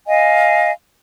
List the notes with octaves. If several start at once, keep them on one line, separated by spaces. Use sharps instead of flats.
D#5 F5 G#5